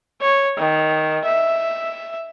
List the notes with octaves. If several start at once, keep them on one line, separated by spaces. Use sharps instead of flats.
C#5
D#3
E5